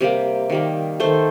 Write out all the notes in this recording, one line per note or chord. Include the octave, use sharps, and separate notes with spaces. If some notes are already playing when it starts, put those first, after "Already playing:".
C3 G3 A#3
D#3 G3 A#3
D#3 A3 C5